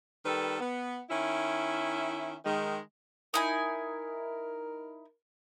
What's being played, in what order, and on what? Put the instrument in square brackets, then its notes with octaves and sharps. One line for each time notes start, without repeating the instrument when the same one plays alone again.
[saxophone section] D#3 G3 A4 B4
B3
D#3 C#4 E4
D#3 G#3
[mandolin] D#4 E4 G#5 [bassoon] A#4